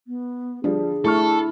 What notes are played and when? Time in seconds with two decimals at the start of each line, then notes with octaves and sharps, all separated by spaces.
0.07 B3
0.64 F3 G3 D4 G#4
1.05 A3 E4 A4 C#6 F6